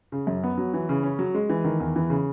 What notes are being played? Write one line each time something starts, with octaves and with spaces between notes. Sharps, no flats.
C#3
F#2
B3
F#3
E3
C#3
C#4
F#3
G#3
E3
D#3
E2
E3
C#3